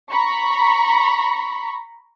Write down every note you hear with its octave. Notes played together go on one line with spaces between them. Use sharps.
A#5 B5 C#6